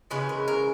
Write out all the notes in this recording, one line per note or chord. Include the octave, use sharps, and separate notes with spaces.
C#3 E3 G#3 B4
A#4
A#4